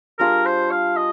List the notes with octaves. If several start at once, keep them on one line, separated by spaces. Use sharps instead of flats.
G3 D4 F4 G#4 A#4
C5
F5
D#5